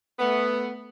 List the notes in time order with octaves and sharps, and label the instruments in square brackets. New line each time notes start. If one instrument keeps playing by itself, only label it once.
[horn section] A3 B3